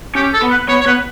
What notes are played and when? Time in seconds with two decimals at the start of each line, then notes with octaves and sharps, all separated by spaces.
0.15 C#4 G4
0.33 A4
0.42 B3
0.50 B4
0.68 B3 C#5
0.81 C#5
0.86 B3 B4